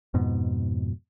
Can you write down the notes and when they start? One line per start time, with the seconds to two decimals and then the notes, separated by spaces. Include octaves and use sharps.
0.14 F2 G#2 B2